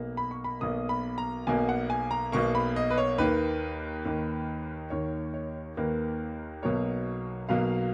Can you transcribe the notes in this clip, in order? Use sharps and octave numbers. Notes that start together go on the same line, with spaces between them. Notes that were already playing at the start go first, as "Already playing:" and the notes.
Already playing: B1 B2 A#3
B5
C#6
B5
B1 B2 A#3 D#6
B5
A#5
B1 B2 A#3 G#5
F#5
G#5
A#5
B1 B2 A#3 C#6
B5
D#5
B4
C#5
D#2 D#3 A#3 B4
D#2 D#3 A#3
D#2 D#3 A#3 C#5
C#5
D#2 D#3 A#3 B4
B1 B2 F#3 A#3 C#5
B1 B2 F#3 A#3 F5